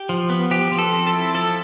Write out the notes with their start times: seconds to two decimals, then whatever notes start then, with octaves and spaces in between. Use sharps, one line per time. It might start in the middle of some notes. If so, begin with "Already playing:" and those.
Already playing: G4
0.09 F3
0.30 B3
0.51 F3 G4
0.72 F3
0.79 A4
0.93 C4
1.07 A4
1.13 E4
1.35 F3 A4